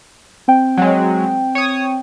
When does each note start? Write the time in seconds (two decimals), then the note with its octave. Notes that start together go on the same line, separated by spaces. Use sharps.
0.48 C4 G5
0.78 F#3 G#3
1.55 C#5 D#6